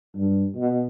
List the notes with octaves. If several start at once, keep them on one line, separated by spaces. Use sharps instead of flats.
G2
B2